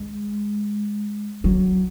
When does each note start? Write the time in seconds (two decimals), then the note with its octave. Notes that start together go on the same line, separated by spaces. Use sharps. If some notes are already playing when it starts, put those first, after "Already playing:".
Already playing: G#3
1.44 F#3